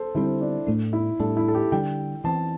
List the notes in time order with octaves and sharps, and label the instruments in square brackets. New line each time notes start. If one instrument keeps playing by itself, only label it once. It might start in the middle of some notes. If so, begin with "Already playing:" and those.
Already playing: [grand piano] A4 C5
[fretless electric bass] D3 G3 C4 [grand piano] E4
[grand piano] D4
[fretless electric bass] A2 A3 D4
[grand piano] E4
[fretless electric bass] A2 G3 D4 [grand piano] A4
[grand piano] E4
A4
G4
[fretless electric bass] D3 G3 D4 [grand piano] G5
[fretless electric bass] E3 C4 [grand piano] A5